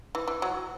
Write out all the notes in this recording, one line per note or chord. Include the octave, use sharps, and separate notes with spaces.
E3
E3
F#3